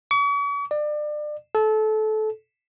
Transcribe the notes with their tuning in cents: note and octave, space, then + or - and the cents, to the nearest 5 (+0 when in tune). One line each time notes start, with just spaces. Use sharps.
C#6 +45
D5 +30
A4 -25